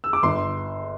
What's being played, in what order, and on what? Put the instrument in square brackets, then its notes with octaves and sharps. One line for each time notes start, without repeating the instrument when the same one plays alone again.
[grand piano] E6
D6
G1 C6